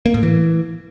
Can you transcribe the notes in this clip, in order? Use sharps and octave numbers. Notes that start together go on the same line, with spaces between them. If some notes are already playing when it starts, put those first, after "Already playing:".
A#3
A2
E3